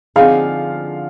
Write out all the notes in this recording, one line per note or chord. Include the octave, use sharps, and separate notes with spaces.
D3 F3 C4 D#4 G#4 F5